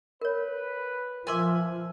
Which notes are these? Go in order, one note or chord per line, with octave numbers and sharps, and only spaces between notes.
A#4 B4 C#5
F3 A#4 E5 G#5 C6 D6